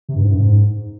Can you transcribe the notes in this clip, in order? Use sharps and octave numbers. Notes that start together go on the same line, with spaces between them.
C3
G2
G#2
F#2
G#2